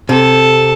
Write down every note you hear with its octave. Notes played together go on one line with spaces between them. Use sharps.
C3 A4